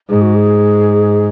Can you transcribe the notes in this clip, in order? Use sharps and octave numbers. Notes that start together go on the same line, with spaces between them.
G#2 G#4
F#4
G#4